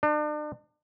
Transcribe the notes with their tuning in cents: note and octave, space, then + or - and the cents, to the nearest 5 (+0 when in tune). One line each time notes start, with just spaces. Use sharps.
D4 +40